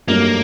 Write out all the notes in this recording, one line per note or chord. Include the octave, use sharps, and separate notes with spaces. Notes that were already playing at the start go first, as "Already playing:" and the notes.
G2 F#3 A3 A#3 D#4 A4